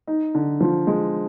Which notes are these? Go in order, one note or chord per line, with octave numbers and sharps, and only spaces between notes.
D#4
D3
F3
G#3